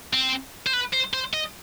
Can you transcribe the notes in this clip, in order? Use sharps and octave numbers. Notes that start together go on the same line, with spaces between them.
C4
C5
B4
C5
C5
D#5